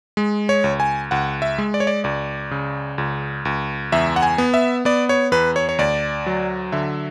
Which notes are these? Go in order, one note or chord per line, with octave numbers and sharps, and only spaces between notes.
G#3
C#5
C#2
G#5
C#2 F#5
E5
G#3
D5
C#5
D5
C#2 D5
C#3
C#2
C#2
E2 E5
F#5
G#5
B3
E5
B3 D5
C#5
E2 B4
C#5
C#5
D2 D5
F#3
D3 E5